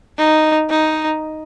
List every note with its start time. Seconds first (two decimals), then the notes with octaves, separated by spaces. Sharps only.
0.18 D#4
0.70 D#4